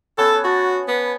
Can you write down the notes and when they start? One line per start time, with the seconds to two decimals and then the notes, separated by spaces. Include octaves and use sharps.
0.18 B3 C#4 A4 C#5
0.44 F#4 A5
0.88 B3